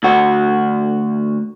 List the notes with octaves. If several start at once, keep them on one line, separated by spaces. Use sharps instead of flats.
D2 F#4